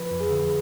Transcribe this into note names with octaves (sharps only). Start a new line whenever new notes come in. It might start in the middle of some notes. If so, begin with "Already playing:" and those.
Already playing: F3 B4
F2
G#4
D3